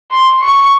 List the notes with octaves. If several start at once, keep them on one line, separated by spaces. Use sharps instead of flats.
C6
C#6